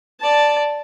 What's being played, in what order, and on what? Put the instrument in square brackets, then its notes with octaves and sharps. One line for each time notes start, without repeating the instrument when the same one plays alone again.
[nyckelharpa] D5 A5